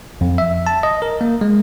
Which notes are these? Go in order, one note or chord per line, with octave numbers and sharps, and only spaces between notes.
F2
E5
A5
D#5
A#4
A#3
G#3